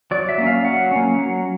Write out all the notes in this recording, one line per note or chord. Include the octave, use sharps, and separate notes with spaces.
F#3 D5
E5
A#3 C#4
F5
F#3 F#5
A#3 C#4
F#3